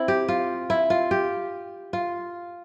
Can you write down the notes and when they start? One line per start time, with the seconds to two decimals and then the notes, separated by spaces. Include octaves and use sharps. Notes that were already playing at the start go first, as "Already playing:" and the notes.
Already playing: C4 E4
0.08 G4
0.28 F4
0.70 E4
0.90 F4
1.11 G4
1.93 F4